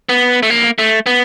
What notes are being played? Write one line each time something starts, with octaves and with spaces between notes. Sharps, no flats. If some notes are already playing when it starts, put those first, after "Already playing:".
B3
A3
A#3
A3
B3